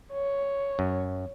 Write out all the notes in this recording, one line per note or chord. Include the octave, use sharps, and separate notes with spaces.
C#5
F#2